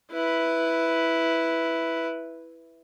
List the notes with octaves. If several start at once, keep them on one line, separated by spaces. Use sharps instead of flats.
E4 B4